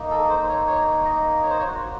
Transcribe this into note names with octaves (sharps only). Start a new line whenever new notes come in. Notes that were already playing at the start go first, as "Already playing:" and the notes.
Already playing: A#3 D#4
A4
C5
C#5
C#5
D#5
C#5
C5
C#5
F#4